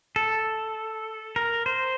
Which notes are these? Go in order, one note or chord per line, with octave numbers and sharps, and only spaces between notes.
A4
A#4
C5